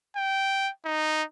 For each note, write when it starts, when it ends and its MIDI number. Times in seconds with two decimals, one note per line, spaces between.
0.16 0.70 79
0.85 1.23 63